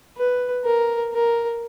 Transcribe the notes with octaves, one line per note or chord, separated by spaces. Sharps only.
B4
A#4
A#4